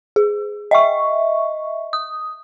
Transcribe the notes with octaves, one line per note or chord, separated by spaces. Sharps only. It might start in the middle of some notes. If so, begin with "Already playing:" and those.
G#4
D#5 E5 C#6
D#6